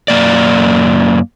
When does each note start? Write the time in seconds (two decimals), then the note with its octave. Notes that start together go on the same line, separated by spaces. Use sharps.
0.08 F#2 E3 A#3 D5